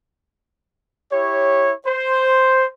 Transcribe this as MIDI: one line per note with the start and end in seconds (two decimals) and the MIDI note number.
1.12 1.72 64
1.12 1.72 67
1.12 1.72 73
1.87 2.66 72